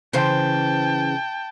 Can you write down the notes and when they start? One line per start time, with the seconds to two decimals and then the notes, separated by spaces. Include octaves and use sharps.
0.13 C#3 E3 C5 G5 A5